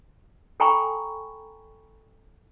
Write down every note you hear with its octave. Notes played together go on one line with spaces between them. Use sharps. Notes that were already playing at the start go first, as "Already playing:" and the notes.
A4 G5 G#5 A#5 B5 C#6